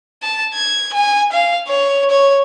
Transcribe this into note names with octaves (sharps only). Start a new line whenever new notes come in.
A5
G#6
G#5
F5
C#5
C#5